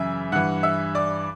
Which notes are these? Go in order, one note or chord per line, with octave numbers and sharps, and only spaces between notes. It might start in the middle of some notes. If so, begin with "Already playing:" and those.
Already playing: F#2 C#3 E3 E5 E6
G2 E3 F#5 F#6
E5 E6
D5 D6